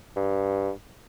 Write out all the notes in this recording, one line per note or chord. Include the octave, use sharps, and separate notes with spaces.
G2